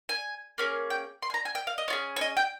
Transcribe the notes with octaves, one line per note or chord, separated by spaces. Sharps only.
G#5
A#3 C#4 G#4
G5
C6
G#5
A#5
G#5
G5
F5
D#5
C#4 F4 G#4
C#5
D#5
G5